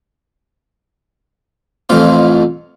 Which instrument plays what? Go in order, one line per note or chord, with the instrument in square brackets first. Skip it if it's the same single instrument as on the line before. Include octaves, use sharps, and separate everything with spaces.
[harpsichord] A1 F2 F4